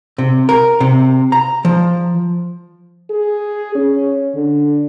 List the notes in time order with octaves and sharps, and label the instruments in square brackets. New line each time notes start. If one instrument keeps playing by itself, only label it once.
[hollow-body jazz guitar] C3
A#4
C3
A#5
F3
[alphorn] G#4
C#4
D3